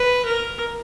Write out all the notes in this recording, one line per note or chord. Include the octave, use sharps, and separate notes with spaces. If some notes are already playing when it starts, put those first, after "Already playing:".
Already playing: B4
A#4